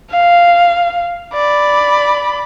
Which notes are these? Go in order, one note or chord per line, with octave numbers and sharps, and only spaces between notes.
F5
D5 B5